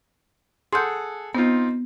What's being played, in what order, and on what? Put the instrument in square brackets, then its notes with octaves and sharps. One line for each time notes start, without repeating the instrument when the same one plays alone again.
[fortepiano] G#4 A4 F#5 [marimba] C6 G6
[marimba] B3 [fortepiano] C4 D#4 F4